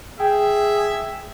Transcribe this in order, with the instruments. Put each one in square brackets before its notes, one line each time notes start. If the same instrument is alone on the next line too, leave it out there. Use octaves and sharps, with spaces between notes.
[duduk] G#4 [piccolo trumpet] E5 [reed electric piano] G5